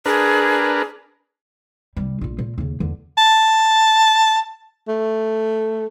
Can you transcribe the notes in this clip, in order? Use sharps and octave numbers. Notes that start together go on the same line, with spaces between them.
D4 G#4 A#4 B4
C2 G3
A#1 F4
A#2
D#2 C#3
E2 D3
A5
A3